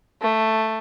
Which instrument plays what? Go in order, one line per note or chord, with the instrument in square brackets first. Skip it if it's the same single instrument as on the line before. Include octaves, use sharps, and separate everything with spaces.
[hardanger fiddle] A3